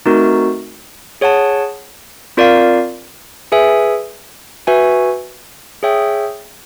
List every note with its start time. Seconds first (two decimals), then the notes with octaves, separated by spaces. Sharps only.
0.06 A3 C4 D#4 F#4 A#4
1.21 G#4 C#5 F#5 A5
2.37 C4 F4 A#4 D5 F5
3.52 G#4 B4 E5 G#5
4.67 F#4 B4 E5 G#5
5.83 G#4 C#5 E5 G5